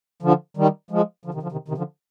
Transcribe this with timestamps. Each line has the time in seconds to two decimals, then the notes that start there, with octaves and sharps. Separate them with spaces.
0.22 D3 F3
0.57 D#3 G3
0.91 F3 G#3
1.25 D3 F3
1.34 C3 D#3
1.42 D3 F3
1.52 C3 D#3
1.68 C3 D#3
1.78 D3 F3